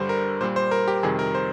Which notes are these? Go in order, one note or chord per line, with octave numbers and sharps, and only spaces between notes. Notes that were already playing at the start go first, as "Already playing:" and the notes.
Already playing: G2 D3 G3 C5
A#4
A#2 G3 C5
C5
A#4
G4
F2 C3 D#3 G3 G#4
A#4
C5